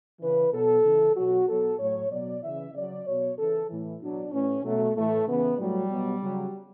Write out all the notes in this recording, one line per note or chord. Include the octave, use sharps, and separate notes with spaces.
C#3 E3 B4
B2 F#3 A4
C#3 E3
B2 F#3 F#4
B2 F#3 A4
A2 F#3 C#5
B2 F#3 D5
C#3 E3 E5
C#3 F#3 D5
B2 F#3 C#5
C#3 E3 A4
A2 E3
B2 F#3 D4
A2 E3 C#4
B2 F#3 A3
A2 E3 A3
C#3 E3 B3
A2 F#3 G3
B2 F#3
C#3 F#3